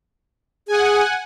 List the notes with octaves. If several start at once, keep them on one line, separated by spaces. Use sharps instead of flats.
G#4 F#5 G#5